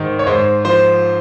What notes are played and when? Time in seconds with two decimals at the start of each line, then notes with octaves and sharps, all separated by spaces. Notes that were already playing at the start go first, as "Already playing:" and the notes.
Already playing: G#2 D#3 C5
0.19 C#5
0.27 G#2 C5
0.65 F3 C5